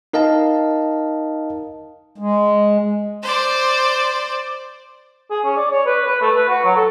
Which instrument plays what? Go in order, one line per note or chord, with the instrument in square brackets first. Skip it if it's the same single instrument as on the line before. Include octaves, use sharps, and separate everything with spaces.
[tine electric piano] D#4 A#4 D#5 F5 A5
[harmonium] G#3
[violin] C5 D5
[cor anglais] G#4
C#4
D5
C#5
B4
B4
A3
B4
F#4
F#3
A4